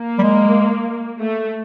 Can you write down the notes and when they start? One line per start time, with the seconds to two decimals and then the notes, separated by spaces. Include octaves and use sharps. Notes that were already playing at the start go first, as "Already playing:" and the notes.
Already playing: A#3
0.19 G3
0.23 G#3
1.18 A3